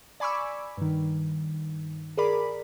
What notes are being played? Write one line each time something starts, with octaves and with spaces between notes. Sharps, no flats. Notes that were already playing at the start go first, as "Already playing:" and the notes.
D5 G#5 B5 C#6 D6 E6
G2 D#3
G#4 A#4 D5 B5